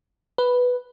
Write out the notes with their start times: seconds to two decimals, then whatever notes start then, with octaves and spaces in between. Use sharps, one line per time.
0.38 B4